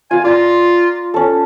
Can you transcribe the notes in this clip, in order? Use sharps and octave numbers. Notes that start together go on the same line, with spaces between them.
F4 F5 G#5
F4 D5 A#5
C#4 A4